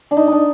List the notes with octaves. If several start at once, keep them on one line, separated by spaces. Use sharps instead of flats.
D4
D#4
D4 D#4